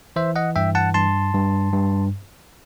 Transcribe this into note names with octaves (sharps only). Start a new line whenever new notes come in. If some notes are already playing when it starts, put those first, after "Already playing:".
E3 C5 E5
D#5 F#5
G2 E5 G5
F#5 A5
G2 A5 C6
G2
G2